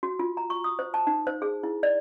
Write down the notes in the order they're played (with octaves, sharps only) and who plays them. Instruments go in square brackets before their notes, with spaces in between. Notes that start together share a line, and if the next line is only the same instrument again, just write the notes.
[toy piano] F#4
F4
A#5
C#6
D#6
C5
A5
D#4
C5
G#4
E4
D5